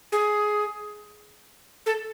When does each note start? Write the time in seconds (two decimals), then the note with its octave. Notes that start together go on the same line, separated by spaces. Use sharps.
0.12 G#4
1.86 A4